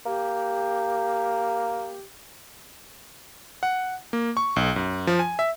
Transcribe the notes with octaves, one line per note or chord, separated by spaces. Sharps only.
A#3 G4
F#5
A#3
C#6
B1
F#2
F3
G#5
E5